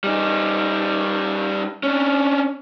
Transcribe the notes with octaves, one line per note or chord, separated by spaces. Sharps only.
G3 D#4
C#4 D4